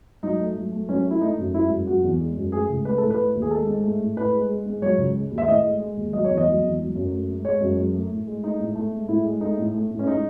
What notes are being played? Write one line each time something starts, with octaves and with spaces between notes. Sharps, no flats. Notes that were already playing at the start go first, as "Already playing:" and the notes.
F#3 D#4
A3
F#3
A3
F#3 C#4
A3
E4
A3 D#4
F#2
G#3 E4
F#2
F#3 F#4
E2
G#3
F#2
A3 G#4
C#2
A3 B4
A2 A4
B4
A3
D#2
G#4
G#3 A4
G#2
A3
A2
A2 B4
G#3
G#3
G#2
F#3 C#5
C#2
G#3
D#2
E5
A2 D#5
G#3
G#3
D#2
F#3 D#5
C#5
E2
D#5
F#3
E2
F#3
F#2
A3
G#2
G#3 C#5
F#2
F#3
A3
A2
G#3
A3 D#4
A2
A3
G#2
A2 E4
G#3
A3 D#4
A2
A3
A2
C#4
G#3 D#4